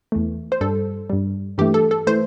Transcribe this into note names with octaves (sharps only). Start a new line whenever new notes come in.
E2 E3 A3
C5
G2 G3 A4
G2 G3
G2 E3 A3 G4
A4
A4
E3 A3 C5